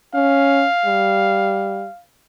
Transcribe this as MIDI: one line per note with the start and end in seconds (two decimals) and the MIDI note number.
0.14 0.65 61
0.14 2.02 77
0.86 1.86 55